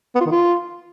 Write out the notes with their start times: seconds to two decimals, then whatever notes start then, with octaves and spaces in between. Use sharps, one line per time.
0.15 B3
0.21 F4
0.26 D#3
0.32 F4